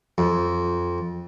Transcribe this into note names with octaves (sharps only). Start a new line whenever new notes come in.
F2